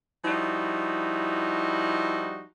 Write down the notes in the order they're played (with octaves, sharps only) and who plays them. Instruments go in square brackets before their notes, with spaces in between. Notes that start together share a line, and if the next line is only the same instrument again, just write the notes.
[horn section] F3 G3 D#4 E4 F#4